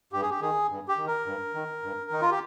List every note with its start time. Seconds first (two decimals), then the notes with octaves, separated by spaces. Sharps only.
0.13 G2 G4
0.22 G#4
0.30 G4
0.41 D#3 G#4
0.70 G2
0.88 G4
0.97 D#3
1.07 A#4
1.26 G2
1.54 D#3
1.82 G2
2.11 D#3 D#4
2.22 F4
2.31 G4